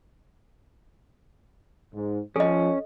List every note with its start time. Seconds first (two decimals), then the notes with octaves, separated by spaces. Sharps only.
1.94 G#2
2.36 F3 C#4 A4 D#5